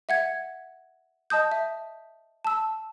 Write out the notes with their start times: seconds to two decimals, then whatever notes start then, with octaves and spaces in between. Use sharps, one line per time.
0.09 E5 F#5 G#6
1.30 D#5 A5 D#6 G6
1.52 E5
2.45 A5 E6